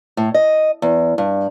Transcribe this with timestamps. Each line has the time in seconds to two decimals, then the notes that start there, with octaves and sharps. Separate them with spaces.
0.17 A2
0.34 D#5
0.82 E2
1.18 G2